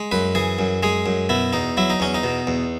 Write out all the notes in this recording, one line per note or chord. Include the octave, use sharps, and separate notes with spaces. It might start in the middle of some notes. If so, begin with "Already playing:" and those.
Already playing: G#3
F#2 B4
E3 G#4
F#2
G#3 G#4
F#2
B2 E4
E2 D#4
F#3 E4
D#4
E2 C#4
D#4
B2
E2